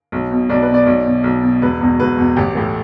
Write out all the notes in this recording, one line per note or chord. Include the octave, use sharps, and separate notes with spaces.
B1
B2
B1 D5
B4
B2
D5
B1
B2
B1
B2
E1 B4
E2 B2
E1 B4
E2 B2
A1 G4
A2 E3